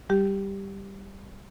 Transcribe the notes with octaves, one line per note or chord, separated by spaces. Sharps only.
G3 G4